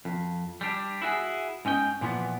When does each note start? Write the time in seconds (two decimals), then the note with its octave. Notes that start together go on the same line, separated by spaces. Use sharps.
0.05 F2
0.61 G3 D4
1.02 E4 F#4 G#4
1.65 G#2 C#4 D#5 G5
2.01 A#2 E3 F3 B3